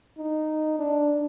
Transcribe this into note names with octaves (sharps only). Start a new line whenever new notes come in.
D#4
D4